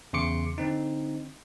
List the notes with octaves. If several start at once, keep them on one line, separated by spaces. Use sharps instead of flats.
E2 C#3 C6 D6 C#7
D3 C4 D#4